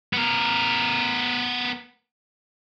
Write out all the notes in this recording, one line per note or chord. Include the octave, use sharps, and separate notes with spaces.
B3 A#4